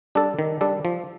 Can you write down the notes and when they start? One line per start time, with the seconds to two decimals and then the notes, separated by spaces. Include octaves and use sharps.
0.15 G3 D4 A4
0.39 D#3
0.61 G3 D4 A4
0.85 F3